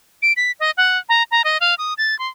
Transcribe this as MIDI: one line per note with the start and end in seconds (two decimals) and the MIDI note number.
0.22 0.33 98
0.37 0.52 95
0.60 0.71 75
0.77 0.98 78
1.09 1.23 82
1.31 1.42 82
1.44 1.57 75
1.61 1.74 77
1.78 1.94 87
1.98 2.17 93
2.19 2.28 84